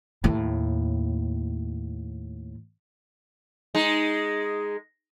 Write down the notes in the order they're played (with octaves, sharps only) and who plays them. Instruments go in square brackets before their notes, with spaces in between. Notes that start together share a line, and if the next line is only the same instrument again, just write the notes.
[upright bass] D#2 A2
[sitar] G#3 D#4